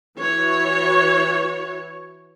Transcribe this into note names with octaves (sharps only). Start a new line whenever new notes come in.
E3 F#4 C#5